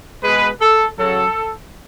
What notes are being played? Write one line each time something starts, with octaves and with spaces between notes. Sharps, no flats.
B2 G#3 B4
A4
C#3 F#3 A4